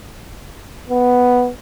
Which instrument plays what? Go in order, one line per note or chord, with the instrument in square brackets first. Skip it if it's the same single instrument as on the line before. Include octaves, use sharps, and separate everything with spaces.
[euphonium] B3